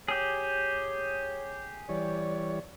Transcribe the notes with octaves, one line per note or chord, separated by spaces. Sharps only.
G4 G#4 C#5
E3 G3 C#5 D5